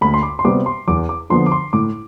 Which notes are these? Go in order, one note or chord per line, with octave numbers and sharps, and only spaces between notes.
D2 B5
C6
D6
C6
C3 G3 B3 D6
C6
E2 D6
D6
D3 F3 B3 C6
D6
C6
A2 D6